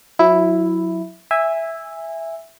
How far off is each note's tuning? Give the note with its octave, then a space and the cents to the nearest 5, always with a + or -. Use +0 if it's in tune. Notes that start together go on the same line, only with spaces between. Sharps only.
F#3 -25 E4 +0
E5 +0 G#5 -20